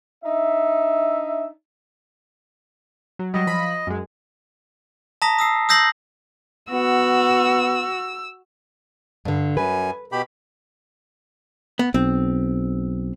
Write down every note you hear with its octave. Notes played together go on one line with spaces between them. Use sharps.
D4 D#4 E5
F#3
F#3 G3 D#5
F3 B5
F#2 G#3
A5 A#5 D#6 A#6 B6
D#6 E6 C7
D#6 E6 G6 A#6 C7 F#7
B3 F#4 E6
G2 D3
F#2 B4 G#5
B2 G4 B5
B3
B1 C4